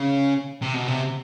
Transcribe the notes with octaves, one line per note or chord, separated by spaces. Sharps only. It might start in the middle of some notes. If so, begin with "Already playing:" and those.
Already playing: C#3
C3
B2
C3